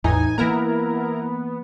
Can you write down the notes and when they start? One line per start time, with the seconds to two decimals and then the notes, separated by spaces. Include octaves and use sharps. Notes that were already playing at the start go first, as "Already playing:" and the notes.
0.04 A1 E2 A2 E3 D#4 G#5
0.38 E3 A#3 B3 E4 A#4 A#5